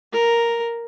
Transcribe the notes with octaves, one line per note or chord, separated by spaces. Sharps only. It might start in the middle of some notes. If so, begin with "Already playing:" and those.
A#4